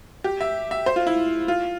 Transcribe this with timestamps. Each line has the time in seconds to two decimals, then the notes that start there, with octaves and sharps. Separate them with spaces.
0.24 G4
0.41 E5
0.71 E5
0.86 C5
0.96 F4
1.07 E4
1.48 F4